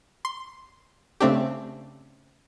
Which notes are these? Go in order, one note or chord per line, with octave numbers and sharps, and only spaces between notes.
C6
C#3 A3 C4 D4 G4